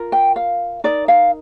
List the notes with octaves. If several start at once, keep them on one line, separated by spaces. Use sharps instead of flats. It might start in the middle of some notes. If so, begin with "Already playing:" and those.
Already playing: F4 A#4
G5
F5
D#4 A#4 D5
F5